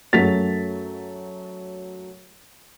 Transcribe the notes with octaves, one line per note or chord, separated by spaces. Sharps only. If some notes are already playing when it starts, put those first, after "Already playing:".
F#2 F#3 A3 A6 B6 F7